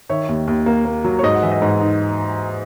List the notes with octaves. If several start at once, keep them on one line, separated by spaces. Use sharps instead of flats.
D#3 C#5 E5
D#2
D#2
A#3
A#3
F#3
C#5
G#2 D#5
F#5
E3 E5
D#5
G#2
D#4